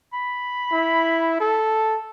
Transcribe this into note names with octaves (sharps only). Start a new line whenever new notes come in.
B5
E4
A4